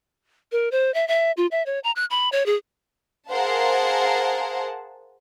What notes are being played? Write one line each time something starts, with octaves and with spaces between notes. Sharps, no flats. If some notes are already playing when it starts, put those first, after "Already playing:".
A#4
C5
E5
E5
F4
E5
C#5
A#5
F#6
B5
C#5
G#4
G#4 A#4 C5 F5 F#5 A5